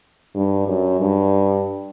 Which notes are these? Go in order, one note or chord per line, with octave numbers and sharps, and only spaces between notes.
G2
F#2
G2